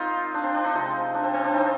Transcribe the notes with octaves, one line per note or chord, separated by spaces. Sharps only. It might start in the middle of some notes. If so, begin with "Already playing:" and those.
Already playing: A#2 C4 D#4 F4
D4
C4
D4
D#4
C3 F3 G#3
D4
C4
C4
D4
D#4